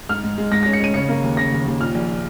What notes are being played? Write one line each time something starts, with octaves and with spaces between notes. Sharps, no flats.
G#2 F6
G#2
G#3
G#2 A#6
C#4 A#6
C#7
C#4 D#7
C#3 C#7
A#3
D#2
C#3 A#6
D#2
D#2
A#2 F6
A#1